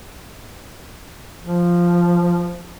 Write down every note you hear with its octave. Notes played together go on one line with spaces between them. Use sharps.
F3